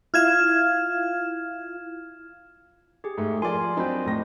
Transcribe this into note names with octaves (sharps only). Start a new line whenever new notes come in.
E4 F4 F5 F6 G#6 E7
G4 G#4
G#2 A3
F3 A#4 D5 G#5 C6
F#3 C4 D4 D#5 B5 G6
F2 A2 A#6